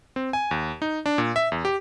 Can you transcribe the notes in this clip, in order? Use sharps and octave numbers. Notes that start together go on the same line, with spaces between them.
C4
G#5
D#2
D#4
D4
A#2
E5
E2
G4